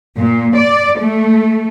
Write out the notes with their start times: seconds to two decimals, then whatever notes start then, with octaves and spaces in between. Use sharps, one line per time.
0.17 A#2
0.55 D5
1.00 A3